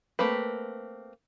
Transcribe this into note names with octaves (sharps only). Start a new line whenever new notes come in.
A3 A#3 C4 B4